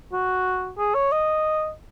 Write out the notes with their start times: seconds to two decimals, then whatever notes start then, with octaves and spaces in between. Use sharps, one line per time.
0.13 F#4
0.78 G#4
0.95 C#5
1.12 D#5